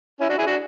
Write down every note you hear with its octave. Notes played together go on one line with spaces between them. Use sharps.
C#4 E4
D4 F#4
E4 G#4
D4 F#4